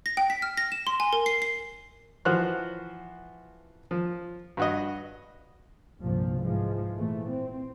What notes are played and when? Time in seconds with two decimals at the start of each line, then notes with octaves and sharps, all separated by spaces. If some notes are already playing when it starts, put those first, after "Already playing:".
0.06 A#6
0.17 G5
0.30 B6
0.42 F6
0.57 A#6
0.72 E7
0.87 C6
1.00 G#5
1.13 A#4
1.26 C7
1.42 C7
2.25 E3 F3 F#4 C5 F6 F#6
3.91 F3
4.57 G2 F#4 D#5
5.99 C2 G2 A#2 D3 F3
6.40 G#2 E3 F3 G#3
6.96 A#2 E3 A3
7.30 C4